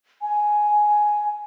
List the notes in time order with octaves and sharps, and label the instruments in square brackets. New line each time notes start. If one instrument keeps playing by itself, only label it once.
[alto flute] G#5